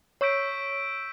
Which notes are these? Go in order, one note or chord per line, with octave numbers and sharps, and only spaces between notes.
C#5 C#6 E6 G6 B6 D7